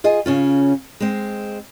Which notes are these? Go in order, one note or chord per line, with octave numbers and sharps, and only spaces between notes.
F4 G#4 D#5
C#3 C#4 F4
G#3 C4